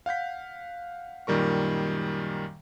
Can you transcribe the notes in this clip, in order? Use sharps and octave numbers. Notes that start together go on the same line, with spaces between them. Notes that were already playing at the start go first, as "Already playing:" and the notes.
F5 F#5 G6 B6
F#2 A#2 D#3 G3 A#4 C#6